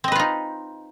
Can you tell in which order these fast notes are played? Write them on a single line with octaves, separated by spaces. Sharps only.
C4 D#5 B4 F4 D#4